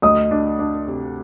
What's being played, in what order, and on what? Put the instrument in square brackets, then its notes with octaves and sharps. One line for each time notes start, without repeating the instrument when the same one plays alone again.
[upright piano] D2 [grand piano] D#5 D#6
[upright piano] D4
D4
C3